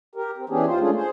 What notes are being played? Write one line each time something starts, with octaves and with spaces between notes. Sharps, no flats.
G4 A#4
C4
E3 B3 C#4 D4 G4 G#4
D#2 F4 C5
G#3 A3 C#4 D4 F4 G#4
G#4 C5